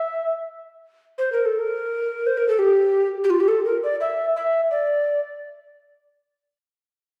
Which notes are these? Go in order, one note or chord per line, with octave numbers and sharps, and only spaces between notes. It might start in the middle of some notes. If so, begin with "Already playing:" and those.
Already playing: E5
C5
A#4
A4
A#4
C5
A#4
A4
G4
G4
F4
G4
A4
A#4
D5
E5
E5
D5